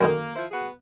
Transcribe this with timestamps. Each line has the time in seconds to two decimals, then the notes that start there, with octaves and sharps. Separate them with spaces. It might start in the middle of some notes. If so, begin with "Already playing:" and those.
0.01 F#2 D3 D#3 A#3
0.36 F3 E4 C5
0.51 B3 F#4 G#4